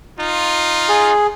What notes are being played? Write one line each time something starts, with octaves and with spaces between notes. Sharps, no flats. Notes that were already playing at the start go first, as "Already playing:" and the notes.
D#4 F4
G#4